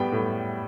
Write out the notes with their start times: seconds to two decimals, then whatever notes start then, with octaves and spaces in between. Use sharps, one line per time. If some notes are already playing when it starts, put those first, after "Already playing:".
Already playing: A2 G3 B3 G5
0.12 A2